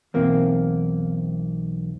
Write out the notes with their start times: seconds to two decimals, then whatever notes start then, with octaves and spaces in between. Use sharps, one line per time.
0.14 B1 E2 A#3 C4